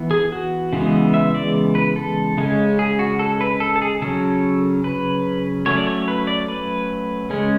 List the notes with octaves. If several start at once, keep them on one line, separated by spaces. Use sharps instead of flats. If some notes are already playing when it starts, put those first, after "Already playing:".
Already playing: E3 B3
G#4
F#4
C#3 E3 G#3 B3
E5
D5
B4
A4
C#3 G#3 C#4
G#4
F#4
A4
B4
A4
A4
G#4
C#3 F#3 C#4 A4
B4
F#3 A3 C#4 C#5
D5
C#5
B4
D5
B4
C#3 G#3 C#4